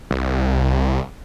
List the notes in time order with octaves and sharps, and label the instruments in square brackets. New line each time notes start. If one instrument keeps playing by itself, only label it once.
[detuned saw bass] C2